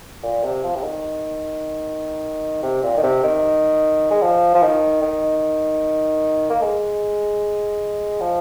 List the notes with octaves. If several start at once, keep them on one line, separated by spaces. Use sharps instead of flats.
A#2
C3
F3
C3
D#3
C3
A#2
D#3
C3
D#3
G#3
F3
F3
D#3
D#3
A#3
G#3
F3